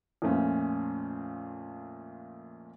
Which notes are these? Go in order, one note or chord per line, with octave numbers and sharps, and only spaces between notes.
F2 A#2 A3 C#4